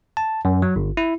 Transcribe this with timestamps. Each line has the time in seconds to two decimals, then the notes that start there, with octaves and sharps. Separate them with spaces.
0.17 A5
0.45 F#2
0.62 F#3
0.76 G1
0.97 E4